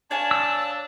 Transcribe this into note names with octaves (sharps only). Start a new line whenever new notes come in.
D4 C#5 F5 G#5 A5
E6